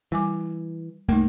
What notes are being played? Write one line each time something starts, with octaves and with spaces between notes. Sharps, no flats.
E3 G3 G#5 D6
C2 F#2 A3 A#3 D#4